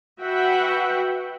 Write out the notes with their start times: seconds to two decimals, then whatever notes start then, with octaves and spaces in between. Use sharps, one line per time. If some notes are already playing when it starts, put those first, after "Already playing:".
0.20 F#4 B4 E5 F#5 G5